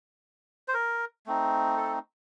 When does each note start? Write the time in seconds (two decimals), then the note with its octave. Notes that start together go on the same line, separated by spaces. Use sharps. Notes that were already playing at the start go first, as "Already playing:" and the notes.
0.68 C5
0.74 A#4
1.26 A3 C4 D#4
1.77 A4